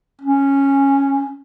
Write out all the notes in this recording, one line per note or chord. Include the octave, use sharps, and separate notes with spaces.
C#4